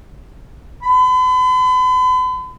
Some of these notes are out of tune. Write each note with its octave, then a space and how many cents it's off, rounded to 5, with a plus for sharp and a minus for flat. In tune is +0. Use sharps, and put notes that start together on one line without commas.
B5 +45